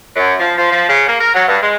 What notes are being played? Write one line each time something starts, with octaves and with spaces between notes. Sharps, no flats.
F#2
F3
F3
F3
C#3
A#3
A#4
F#3
G2
G#3